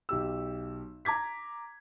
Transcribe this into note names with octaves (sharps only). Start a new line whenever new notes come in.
B1 G4 E6
A#5 D6 G#6 B6